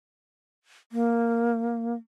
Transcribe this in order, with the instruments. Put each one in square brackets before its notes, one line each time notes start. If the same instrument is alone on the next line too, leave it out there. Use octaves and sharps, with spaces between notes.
[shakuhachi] A#3